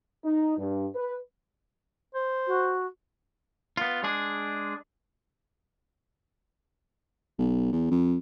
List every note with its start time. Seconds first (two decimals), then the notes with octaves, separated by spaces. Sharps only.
0.24 D#4
0.58 G2
0.95 B4
2.14 C5
2.47 F#4
3.77 B3 F4
4.03 G#3 D4 G#4
7.39 B1
7.72 E2
7.90 F2